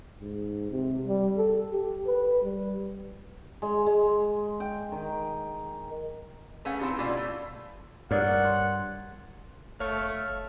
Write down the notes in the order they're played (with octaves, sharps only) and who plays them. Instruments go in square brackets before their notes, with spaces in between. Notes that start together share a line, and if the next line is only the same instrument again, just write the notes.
[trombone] G#2
C3
G3
A4
G4
B4
G3
[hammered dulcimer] G#3
G#3
G5
D#3
[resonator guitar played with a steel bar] A3 C#4 G#4 B4 F5 F#5
B3 C4 D#4 E4 G4
B2 G3 A#3 C#4 E4 F4
A3
[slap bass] G2 [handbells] A#4 C#5 D5 [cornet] F#5
[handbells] C6
[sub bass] F#1 [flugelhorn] A3 [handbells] C#5 [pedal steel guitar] F5 C#6